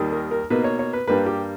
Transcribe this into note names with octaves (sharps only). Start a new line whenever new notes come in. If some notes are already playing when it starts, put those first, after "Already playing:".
Already playing: D#2 D#3 G3
A#4
A#4
B2 A#3 D#4 B4
C#5
C#5
B4
G2 G3 A#3 B4
G4